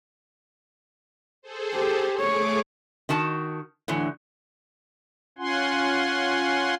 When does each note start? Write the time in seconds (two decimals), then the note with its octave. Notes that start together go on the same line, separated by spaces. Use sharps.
1.42 G#4 A4 C5
1.74 G4
2.21 A3 G#4 C#5 D6
3.09 D#3 F#4 A5
3.88 A2 D3 E3 F#3
5.38 C#4 F4 F#5 G#5 C6